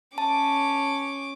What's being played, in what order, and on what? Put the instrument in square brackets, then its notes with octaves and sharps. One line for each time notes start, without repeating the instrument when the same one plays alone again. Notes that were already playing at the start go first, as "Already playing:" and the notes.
[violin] C#4 D6 [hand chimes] A5